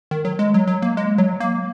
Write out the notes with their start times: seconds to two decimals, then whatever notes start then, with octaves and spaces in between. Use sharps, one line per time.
0.11 D#3
0.25 F#3
0.39 G#3
0.54 F#3
0.67 F#3
0.82 A#3
0.97 G#3
1.18 F#3
1.40 A#3